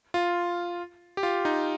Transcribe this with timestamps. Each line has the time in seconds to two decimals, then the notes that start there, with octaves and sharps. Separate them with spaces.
0.14 F4
1.17 G4
1.23 F4
1.45 D#4